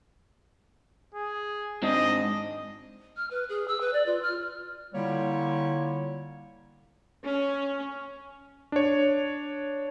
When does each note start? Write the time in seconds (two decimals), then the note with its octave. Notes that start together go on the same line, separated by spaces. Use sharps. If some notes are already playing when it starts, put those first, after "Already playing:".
1.14 G#4
1.82 G#2 C4 D4 D#5
3.17 F6
3.31 B4
3.49 G#4
3.68 E6
3.81 B4
3.93 D5
4.06 F4
4.22 F6
4.94 D3 G3 A#3 E4 F4 C#5
7.22 C#4
8.72 D4 C#5